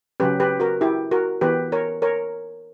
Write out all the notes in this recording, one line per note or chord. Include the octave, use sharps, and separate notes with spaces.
C#3 F#3 C#4 G4 B4
G4 B4
F#4 A#4
E4 G4
F#4 A#4
E3 B3 G4 B4
A#4 C#5
A#4 C#5